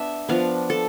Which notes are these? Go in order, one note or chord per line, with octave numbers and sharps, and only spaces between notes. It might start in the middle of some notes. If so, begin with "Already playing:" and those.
Already playing: B3 D4 E5
F3 B3 D4 F5
A4